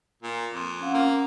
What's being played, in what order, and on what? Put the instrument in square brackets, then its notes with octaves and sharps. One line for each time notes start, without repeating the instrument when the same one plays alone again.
[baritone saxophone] A#2
F2
[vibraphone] C#4 F5 F#5
[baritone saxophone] A#3 [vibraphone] C#4